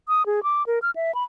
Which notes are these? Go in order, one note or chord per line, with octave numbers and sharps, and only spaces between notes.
D#6
G#4
D6
A#4
F6
E5
B5